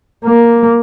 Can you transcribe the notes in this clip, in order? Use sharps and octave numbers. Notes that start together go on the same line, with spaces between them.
A#3